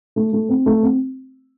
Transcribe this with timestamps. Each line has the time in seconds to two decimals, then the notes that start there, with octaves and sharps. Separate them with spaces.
0.16 A3
0.33 A3
0.49 C4
0.66 A3
0.83 C4